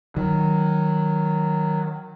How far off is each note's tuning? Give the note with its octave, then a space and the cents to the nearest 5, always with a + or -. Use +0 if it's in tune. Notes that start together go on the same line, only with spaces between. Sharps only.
D#3 +0 F#3 +0